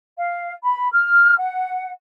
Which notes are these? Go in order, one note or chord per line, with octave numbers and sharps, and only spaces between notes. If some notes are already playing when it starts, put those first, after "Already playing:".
F5
B5
F6
F#5